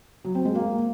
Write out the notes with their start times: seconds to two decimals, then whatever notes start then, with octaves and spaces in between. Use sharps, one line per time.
0.25 F#3
0.35 C4
0.45 G#3
0.55 A#3